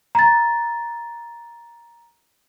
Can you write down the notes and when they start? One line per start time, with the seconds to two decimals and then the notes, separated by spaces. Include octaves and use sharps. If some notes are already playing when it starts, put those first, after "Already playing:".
0.15 A#5 A6